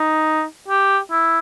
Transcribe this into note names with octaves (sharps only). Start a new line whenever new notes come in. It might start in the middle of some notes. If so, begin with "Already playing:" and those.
Already playing: D#4
G4
E4